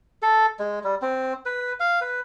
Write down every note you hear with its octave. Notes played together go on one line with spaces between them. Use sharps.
A4
G#3
G3
C4
B4
F5
B4